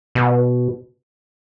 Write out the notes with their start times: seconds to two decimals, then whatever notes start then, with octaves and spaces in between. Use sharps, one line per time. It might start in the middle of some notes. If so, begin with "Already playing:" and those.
0.15 B2